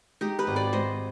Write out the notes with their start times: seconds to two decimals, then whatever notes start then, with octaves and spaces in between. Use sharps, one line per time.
0.21 G#3 D#4 G4
0.39 G4 B4
0.47 G#1
0.56 B4 D5
0.73 G#3 C5 D#5